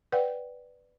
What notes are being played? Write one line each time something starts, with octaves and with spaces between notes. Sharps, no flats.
B4 D5 F#5 G5